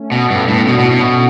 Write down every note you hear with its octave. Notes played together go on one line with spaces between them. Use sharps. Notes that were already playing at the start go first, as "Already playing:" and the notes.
Already playing: A3 C#4
B2
G2 A3 C#4
A2 B3 D4
B2 D4 F#4
B2
C#4 E4
B2
F#4 A4